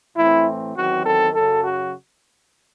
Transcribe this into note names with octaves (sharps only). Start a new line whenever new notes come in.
A2 E3 A3 C4 E4
E2 D#3 F#3 C4 F#4
A4
F#2 C#3 F#3 A4
F#4